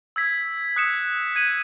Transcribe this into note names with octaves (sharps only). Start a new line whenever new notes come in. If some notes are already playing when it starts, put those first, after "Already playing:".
E6 G#6 B6
D#6 F#6 C#7 E7
G#6 B6 D#7 F#7